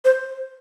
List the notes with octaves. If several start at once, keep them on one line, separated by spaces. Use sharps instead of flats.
C5